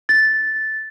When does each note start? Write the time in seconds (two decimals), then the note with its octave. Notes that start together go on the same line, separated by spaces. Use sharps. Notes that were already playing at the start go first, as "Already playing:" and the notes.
0.09 A6